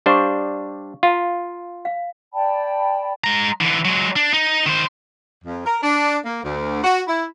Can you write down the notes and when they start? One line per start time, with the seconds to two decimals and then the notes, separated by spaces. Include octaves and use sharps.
0.06 G3 D4 C5 D5 F5 C#6
1.03 F4 F5 A#5
1.85 F5
2.34 D5 G5 A5 B5
3.24 G#3 A#5
3.61 D3 E3
3.85 F#3 G#3
4.16 D4
4.33 D#4
4.66 D#3 C5
5.44 F2
5.65 A#4
5.83 D4
6.25 A#3
6.44 D2
6.84 F#4
7.08 E4